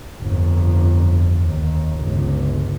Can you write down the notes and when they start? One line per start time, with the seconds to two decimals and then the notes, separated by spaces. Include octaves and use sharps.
0.22 G1 F2
1.41 D#2
2.00 G1 C#2